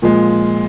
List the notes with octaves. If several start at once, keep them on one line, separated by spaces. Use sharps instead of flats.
A#2 F3 G#3